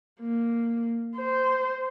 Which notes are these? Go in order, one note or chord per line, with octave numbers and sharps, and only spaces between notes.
A#3
C5